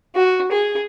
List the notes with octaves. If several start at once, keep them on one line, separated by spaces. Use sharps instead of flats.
F#4
G#4